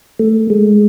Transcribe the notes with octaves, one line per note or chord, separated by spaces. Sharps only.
A3
G#3